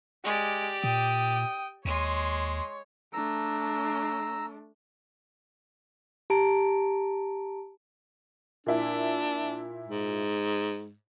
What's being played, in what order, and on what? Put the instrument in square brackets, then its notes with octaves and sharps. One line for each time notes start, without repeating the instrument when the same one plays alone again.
[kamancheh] G#3 [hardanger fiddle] G4 D5
[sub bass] A#2 [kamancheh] G5 D#6
[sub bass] D#2 [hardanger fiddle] G#3 C6 [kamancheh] C#5
[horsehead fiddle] A3 D4 [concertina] A#5 E6
[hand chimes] G4 A5 A#5 D7
[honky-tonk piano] A#2 E4 [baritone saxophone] D4
[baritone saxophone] G#2